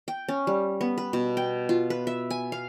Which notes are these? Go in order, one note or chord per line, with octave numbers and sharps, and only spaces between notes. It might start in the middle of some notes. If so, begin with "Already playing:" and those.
G5
C#4
G3
B3
B4
B2
G5
F4
B4
E5
G#5
F5